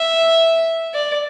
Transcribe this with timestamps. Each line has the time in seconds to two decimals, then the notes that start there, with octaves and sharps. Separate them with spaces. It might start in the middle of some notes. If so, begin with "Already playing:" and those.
Already playing: E5
0.94 D5